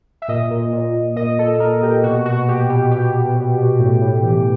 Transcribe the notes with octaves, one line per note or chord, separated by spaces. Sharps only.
E5
A#2 D#5
A#2
A#2
A#2
A#2 D#5
A#2 A4
A#2 A#4
A#2 G4
B2 F#4
B2 F#4
B2 G4
B2 G4
B2 G4
B2
B2
B2
A2
A2
E3